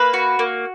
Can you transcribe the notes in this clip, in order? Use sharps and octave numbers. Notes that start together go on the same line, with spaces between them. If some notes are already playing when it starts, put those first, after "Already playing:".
Already playing: A#3 B4
F#4
A#3